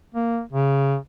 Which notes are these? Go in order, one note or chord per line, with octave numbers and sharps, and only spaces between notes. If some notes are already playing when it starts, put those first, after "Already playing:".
A#3
C#3